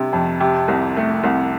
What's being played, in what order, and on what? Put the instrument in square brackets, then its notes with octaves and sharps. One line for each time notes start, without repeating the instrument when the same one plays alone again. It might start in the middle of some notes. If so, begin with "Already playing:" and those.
Already playing: [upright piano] C3 G3 D4
F2
C3
C2
A3
C2